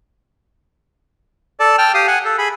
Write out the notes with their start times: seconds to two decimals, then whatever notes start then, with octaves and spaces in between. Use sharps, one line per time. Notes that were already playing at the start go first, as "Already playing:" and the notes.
1.60 A4 D5 A5
1.78 G5 A5 F6
1.94 G4 F5 D#6
2.07 F#5 G#5
2.25 A4
2.38 G#4 B5